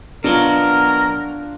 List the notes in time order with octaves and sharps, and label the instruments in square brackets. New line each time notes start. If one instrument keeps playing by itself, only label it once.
[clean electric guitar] B2 F#3 [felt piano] D4 F4 [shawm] A#4